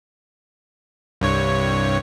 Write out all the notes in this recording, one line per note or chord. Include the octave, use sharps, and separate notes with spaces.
C2 G2 C#5